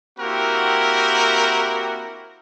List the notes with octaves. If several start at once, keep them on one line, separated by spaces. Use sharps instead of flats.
A#3 C4 E4 F#4 G4 A#4